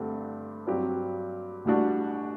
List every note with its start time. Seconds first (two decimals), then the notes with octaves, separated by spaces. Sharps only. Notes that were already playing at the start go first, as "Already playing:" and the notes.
Already playing: G2 D3 A3 C4 G4
0.67 G2 F#3 C4 G4
1.65 A1 A2 G3 D4 F#4